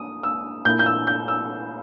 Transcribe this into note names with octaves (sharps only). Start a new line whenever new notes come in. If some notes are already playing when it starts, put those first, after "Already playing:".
Already playing: D#6
E6
A#2 A#3 E4 G6
G6
E6
G6
E6